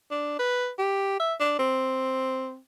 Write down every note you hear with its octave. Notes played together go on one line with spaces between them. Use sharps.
D4
B4
G4
E5
D4
C4